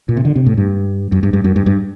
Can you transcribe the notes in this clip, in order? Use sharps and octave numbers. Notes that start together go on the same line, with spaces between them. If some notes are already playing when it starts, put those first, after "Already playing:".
A#2
C3
D3
C3
A2
G2
F#2
G2
G2
F#2
G2
G2